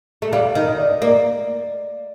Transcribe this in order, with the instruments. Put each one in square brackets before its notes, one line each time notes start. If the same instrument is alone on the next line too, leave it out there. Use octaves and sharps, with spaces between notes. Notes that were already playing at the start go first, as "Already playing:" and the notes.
[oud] A3
[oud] G3 [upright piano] F5
[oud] D#3
[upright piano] D#5
D5
D#5
[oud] A#3 [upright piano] D5